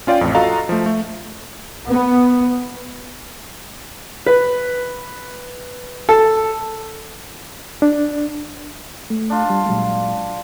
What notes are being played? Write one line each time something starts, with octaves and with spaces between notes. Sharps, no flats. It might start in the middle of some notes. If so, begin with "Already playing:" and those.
C#4 F4 D5 F5 G5
A1 F2
F4 F#4 A4 D#5 F5 A#5
F3 A3
A3
B3
B4
A4
D4
A3
D4 F4
G3
A#2 F#3 G#3